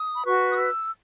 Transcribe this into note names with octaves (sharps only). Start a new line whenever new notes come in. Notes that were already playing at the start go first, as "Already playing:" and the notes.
Already playing: D#6
B5
F#4 B4 C#6
D#6
E6